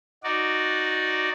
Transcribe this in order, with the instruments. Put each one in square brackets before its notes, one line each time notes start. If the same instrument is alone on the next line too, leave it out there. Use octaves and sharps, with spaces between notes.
[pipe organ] D#4 F#4 D5